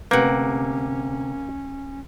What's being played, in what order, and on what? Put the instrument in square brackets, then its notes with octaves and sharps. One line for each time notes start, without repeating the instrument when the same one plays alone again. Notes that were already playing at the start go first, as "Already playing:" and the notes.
[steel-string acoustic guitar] D2 C3 [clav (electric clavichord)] A#3 F#5 [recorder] C#4 [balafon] B4